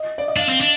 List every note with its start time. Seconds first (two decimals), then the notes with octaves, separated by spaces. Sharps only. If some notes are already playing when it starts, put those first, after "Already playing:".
Already playing: D#5
0.18 D5
0.28 D#5
0.37 D4 F5
0.49 C4
0.61 D4